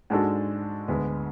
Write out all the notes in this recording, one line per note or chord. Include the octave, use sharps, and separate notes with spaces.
G#2 G#3 D4 F#4 A4
D2 D3 G#3 B3